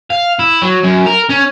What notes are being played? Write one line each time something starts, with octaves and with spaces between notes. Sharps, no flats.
F5
E4
F#3
F#2
A#4
C#4